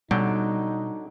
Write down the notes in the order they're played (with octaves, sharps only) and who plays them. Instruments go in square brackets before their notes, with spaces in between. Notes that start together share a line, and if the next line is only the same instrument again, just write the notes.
[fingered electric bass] B2 [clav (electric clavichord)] D3 F#3 G5 [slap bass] G3 [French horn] D#4